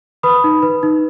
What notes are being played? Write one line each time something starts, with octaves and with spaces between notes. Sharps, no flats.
B4 B5 D#6
D#4
B4
D#4